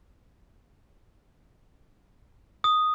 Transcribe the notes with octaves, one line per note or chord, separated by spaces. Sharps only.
D#6